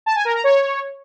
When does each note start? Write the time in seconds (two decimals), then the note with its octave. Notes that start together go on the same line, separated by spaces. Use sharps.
0.06 A5
0.16 G#5
0.25 A#4
0.34 A#5
0.44 C#5